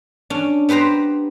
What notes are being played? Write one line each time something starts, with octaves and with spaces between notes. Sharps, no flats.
C#4 D4
B3 G4 B4 C5 A#5